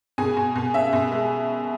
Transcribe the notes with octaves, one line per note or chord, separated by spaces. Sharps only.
B2 G#4 G#5
B2
B2
C#4 E5
B2
G#3